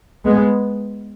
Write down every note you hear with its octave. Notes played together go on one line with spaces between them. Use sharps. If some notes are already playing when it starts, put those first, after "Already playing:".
G#3 B3